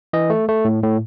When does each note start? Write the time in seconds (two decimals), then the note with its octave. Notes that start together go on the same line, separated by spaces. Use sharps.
0.13 E3 D#5
0.30 A3
0.49 A3
0.65 A2
0.83 A2